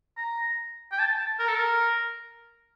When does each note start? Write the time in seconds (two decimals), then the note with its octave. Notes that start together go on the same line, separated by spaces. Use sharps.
0.17 A#5
0.92 G5
0.99 A5
1.19 A5
1.39 A#4
1.48 A4
1.56 A#4